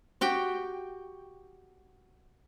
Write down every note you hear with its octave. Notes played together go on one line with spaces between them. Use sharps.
F#4 G4 G5